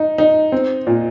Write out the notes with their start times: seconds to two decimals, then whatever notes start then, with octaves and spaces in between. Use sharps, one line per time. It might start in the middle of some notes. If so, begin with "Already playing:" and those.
Already playing: D#4
0.18 D#4
0.52 C4
0.87 A#2